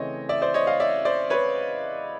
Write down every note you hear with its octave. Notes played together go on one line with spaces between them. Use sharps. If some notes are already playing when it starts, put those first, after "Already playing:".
Already playing: C#3 E3 A3 C4 C#5 D#5
D5 E5
C5 D5
C#5 D#5
D#5 F5
D5 E5
C5 D5
B4 C#5